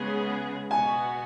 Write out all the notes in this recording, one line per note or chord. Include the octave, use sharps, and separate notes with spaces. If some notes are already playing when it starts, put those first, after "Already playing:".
Already playing: C#3 G#3 B3 G#4
B2 B3 F#4 G#5